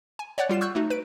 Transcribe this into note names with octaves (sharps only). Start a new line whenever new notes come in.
G#5
C#5 D5 F#5 F#6
G3 F4 C7 E7
C#6 E6 F#6 G6
A3 D#4 F#4
B4 D7